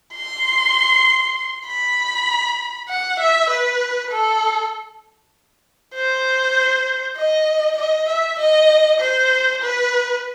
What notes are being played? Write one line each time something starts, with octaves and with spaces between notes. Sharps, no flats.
C6
B5
F#5
E5
B4
A4
C5
D#5
D#5
E5
D#5
C5
B4